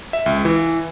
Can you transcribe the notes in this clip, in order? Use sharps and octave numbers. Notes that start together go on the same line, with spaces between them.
E5
C#2
E3